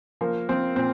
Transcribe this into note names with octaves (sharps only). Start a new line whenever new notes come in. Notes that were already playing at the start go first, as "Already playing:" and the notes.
F3 A#3
F3 C4
A#2 C4